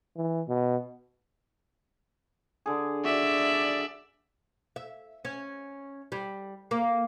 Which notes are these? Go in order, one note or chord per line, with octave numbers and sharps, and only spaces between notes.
E3
B2
D3 G#4
F#4 D5 E5
E5
C#4
G3
A#3